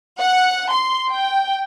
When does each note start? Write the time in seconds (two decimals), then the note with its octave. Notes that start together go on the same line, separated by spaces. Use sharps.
0.20 F#5
0.72 C6
1.11 G5